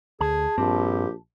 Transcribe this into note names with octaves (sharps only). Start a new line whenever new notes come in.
D2 G#4 A5
A#1 G2 C4 G4